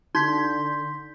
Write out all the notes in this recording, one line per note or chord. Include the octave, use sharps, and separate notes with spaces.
D3 D#4 C6 G6 B6